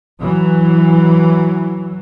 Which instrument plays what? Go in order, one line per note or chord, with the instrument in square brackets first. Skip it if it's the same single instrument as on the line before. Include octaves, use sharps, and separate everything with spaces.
[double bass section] E3 F#3